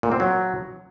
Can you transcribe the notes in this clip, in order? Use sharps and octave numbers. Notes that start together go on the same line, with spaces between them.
A#2
C4
F#3